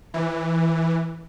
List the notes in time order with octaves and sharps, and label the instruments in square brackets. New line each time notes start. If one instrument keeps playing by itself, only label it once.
[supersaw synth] E3